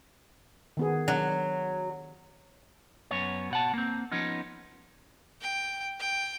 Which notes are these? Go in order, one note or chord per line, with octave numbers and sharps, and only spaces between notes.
D#3 B3 G#4
F#3 D4
F#2 B3 C#5
B2 F#5 A5
A#3 C4
F3 B3 C#4 D#4
G5
G5